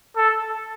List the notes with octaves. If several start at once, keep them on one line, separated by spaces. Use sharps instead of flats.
A4